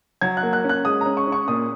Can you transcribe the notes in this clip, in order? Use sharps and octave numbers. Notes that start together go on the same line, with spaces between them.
F#3 G#6
F#6
A#3
F#6
C#4
F#6
G#3 D#6
C#4 A#5
C#6
C#4
C#6
A#2 D#6